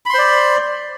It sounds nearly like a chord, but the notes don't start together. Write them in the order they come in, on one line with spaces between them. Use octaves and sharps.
B5 C6 C5 D5